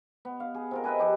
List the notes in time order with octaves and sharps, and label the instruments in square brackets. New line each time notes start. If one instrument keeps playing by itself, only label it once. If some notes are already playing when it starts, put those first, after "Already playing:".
[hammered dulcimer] B3
F5
G#4
C3 F4 A#4
G#4 B4 D#5 E5
F3 G4